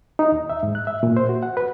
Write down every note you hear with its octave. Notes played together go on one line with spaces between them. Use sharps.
D#4
D#2
E5
G#2
F#6
E5
A#2
C5
F#4
F#5
B4